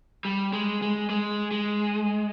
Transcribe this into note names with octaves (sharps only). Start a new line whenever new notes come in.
G3
G#3
G#3
G#3
G#3